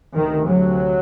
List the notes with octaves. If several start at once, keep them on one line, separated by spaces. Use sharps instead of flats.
D2 C3 D#3
F#3